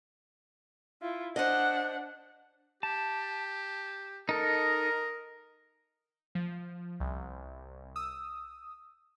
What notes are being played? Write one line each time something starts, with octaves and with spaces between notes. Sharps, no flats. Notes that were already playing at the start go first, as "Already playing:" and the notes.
E4 F4
D4 C5 D#5 F#5
G4 A5
D#4 A4 A#4 D#5
F3
C2
D#6 E6